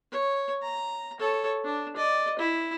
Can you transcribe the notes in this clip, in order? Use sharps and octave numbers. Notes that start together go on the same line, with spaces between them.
C#5
A#5
A4 C#5
D4
D5 D#5
E4